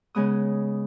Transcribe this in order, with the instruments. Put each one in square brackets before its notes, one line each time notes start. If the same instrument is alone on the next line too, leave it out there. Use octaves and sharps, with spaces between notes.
[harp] C#3 G#3 B3 D#6